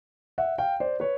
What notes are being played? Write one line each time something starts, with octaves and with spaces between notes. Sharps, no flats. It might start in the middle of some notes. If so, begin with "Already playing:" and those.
E5 F#5
F5 G5
C5 D5
B4 C#5